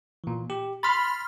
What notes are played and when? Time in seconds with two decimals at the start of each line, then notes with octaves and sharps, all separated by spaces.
0.24 A#2 E3
0.50 G4
0.83 B5 C6 F6 A6 B6